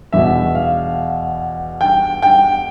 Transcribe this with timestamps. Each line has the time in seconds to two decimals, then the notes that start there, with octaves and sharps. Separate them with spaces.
0.12 E2 B2 E5
0.55 F5
1.81 G5
2.22 G5